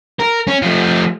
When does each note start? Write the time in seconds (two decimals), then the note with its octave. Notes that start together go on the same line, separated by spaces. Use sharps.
0.20 A#4
0.48 C#4
0.62 F3 A3